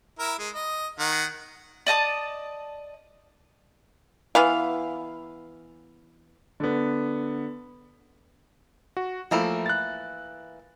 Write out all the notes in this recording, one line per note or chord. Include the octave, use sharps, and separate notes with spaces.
E4 A#4
G#3
D#5
D#3 F#5
D5 D#5 A5 D#6
E3 B3 F5
D3 B3
F#4
E3 F3 A3 A#3 E4
F#6 A6